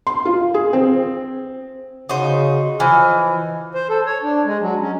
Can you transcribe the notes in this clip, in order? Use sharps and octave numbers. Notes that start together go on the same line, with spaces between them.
C6
F4
G#4
C4
C#3 D#4 F#4 C5
E3 F3 D#5 F6
C5
A4
C#5
D4
G#3
F#3
C#4